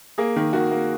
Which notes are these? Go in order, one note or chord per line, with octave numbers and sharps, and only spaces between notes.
A#3 G#4
D#3
D#3 F#4
A#3